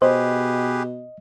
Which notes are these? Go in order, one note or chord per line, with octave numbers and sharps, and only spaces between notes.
B2 G4 G#4 B4 C5 D#5